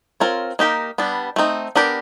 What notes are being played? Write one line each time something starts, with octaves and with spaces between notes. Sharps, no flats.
C4 F4 A#4 C#5
A#3 D#4 G4 A#4
G3 B3 D4
A3 C4 D#4
B3 D4 G4 A#4 D5